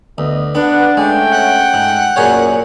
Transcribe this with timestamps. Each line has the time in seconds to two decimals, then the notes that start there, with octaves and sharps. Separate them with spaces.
0.18 D2 B3 D#5
0.55 B3 D4 B4 F#5
0.97 G#3 A3 C#4 G5
1.31 F#5
1.74 G#2
2.16 F#2 A#2 G#4 C#5